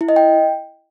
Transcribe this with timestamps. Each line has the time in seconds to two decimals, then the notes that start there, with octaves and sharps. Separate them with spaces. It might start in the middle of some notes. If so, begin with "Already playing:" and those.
0.01 E4
0.09 D#5
0.16 G5